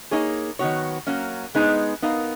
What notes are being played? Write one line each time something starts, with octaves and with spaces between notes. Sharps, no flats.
A#3 D#4 G#4 C#5
D#3 F#3 B3 F#4 C#5
F#3 A#3 C#4
G#3 B3 D#4 G#4
B3 D#4 A#4 F5